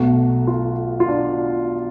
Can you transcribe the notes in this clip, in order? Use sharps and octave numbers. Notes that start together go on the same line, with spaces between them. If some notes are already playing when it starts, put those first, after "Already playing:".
Already playing: B1 B2 A3 F#4
F4
F4
D4